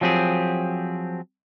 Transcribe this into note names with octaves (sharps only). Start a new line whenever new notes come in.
F3 F#3 C4 G4 G#4